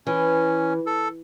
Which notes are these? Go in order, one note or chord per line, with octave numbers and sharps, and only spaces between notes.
E3 C#4
A4